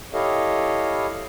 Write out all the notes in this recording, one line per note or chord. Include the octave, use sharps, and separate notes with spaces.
E4 G4 A4 C#5 D#5 F5